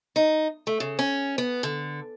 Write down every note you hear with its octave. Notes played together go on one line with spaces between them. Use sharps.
D#4
A3
C#3
C#4
B3
D3